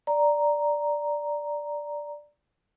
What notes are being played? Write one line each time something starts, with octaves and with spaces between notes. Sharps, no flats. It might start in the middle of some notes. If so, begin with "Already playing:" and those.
D5 A#5